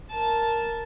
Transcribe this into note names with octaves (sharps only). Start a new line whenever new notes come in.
A#4 A5